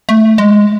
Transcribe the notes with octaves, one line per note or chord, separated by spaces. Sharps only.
A3
G#3